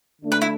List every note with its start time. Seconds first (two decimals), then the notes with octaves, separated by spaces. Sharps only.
0.21 D2 D3 A3 D4
0.32 B4
0.42 E4